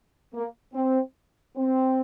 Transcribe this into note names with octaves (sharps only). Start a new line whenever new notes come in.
A#3
C4
C4